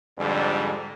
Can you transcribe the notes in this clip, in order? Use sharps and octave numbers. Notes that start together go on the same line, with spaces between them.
F2 G#2 D3 G3